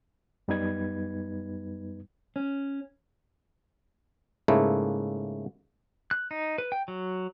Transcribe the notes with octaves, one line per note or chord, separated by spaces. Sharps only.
F#2 G3 B3 D#4 B4 G#6
C#4
G#2 C#3 A3 A#3 E4
F#6
D#4
B4
G5
F#3